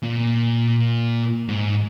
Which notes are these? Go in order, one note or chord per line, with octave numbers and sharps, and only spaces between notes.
A#2
G#2